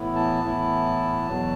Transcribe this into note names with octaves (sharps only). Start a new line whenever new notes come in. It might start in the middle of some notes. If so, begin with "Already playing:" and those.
Already playing: A2 E3 B3 E4
A5
A2 E3 B3 E4
E2 B2 F#3